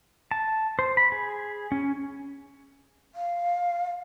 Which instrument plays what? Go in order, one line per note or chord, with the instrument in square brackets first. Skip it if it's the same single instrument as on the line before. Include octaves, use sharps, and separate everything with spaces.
[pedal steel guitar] A5
C5
B5
G#4
C#4
[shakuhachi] F5